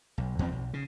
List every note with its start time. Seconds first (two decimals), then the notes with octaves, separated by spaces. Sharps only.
0.18 B1
0.39 E2 F3 G3 C4
0.52 B1
0.73 C#3